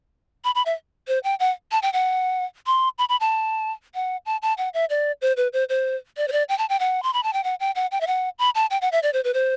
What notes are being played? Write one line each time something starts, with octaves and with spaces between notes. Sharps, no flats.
B5
B5
E5
C5
G5
F#5
A5
G5
F#5
C6
B5
B5
A5
F#5
A5
A5
F#5
E5
D5
C5
B4
C5
C5
D5
C5
D5
G5
A5
G5
F#5
C6
B5
A5
G5
F#5
G5
F#5
G5
E5
F#5
B5
A5
G5
F#5
E5
D5
C5
B4
C5